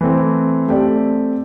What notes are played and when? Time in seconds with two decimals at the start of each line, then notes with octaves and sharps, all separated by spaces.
0.01 E3 A3 C4
0.68 A3 C4 G4 D5